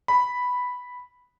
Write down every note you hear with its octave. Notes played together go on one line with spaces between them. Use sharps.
B5